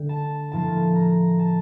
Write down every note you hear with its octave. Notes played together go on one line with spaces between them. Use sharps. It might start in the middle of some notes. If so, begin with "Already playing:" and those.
Already playing: D3 A3 G5
A5
A2 F3 A#3 A5
A#5
A5